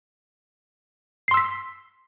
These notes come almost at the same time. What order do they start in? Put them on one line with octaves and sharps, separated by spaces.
C7 C6 E6 B6